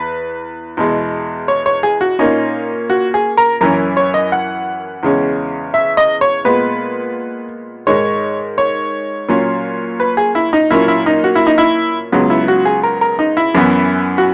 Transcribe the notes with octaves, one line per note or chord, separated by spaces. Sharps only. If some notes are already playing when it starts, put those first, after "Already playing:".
Already playing: E2 B4
E2 B2 G#3
C#5
C#5
G#4
F#4
A#2 A#3 C#4 D#4
F#4
G#4
A#4
F#2 E3 A#3 C#4 A#4
C#5
D#5
F#5
E2 C#3 G#3 C#4
E5
D#5
C#5
A#2 G#3 B3 B4
G#2 D#3 G#3 C#5
C#5
A#2 F#3 C#4
B4
G#4
E4
D#4
A#2 F#3 A#3 C#4 E4
E4
D#4
F#4
E4
D#4
E4
C#2 C#3 F#3 B3
E4
F#4
G#4
A#4
A#4
D#4
E4
F#2 E3 B3
F#4